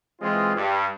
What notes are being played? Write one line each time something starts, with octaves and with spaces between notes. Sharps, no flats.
E3 G#3 C4 F4
G2